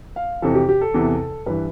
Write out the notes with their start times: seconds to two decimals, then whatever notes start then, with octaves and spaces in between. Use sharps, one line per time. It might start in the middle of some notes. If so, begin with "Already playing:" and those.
0.16 F5
0.42 F2 C3 E3 A4
0.55 G4
0.68 G4
0.81 A4
0.94 E2 C3 E3
1.46 G2 E3 B4